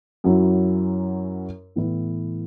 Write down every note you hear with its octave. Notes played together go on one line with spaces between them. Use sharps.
F#2 F#3 C#4 E4
A2 E3 B3 E4